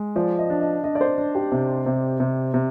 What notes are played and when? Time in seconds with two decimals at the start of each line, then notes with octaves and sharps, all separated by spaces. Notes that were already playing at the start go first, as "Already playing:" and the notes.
Already playing: G#3
0.16 F3 D5
0.38 D#5
0.50 D4
0.61 D#5
0.83 D4 D#5
0.95 D5
1.01 C5
1.18 D4
1.35 G4
1.52 C3
1.86 C3
2.20 C3
2.54 C3